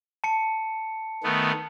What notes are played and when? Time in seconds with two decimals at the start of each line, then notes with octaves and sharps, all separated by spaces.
0.24 A5 C#7
1.24 D#3 A3 B3